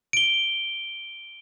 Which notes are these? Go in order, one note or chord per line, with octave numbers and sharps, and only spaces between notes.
D7 G7